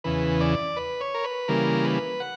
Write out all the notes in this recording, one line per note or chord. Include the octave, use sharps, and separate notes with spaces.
E2 C#3 E3 B4
D5
B4
C#5
A#4
B4
C#3 E3 G3 A#3 A#4
B4
F#5